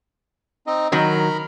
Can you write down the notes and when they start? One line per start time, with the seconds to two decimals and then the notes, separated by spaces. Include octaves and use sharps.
0.67 C4 D#4 D#5
0.92 D#3 F#3 A#4 A#5 B5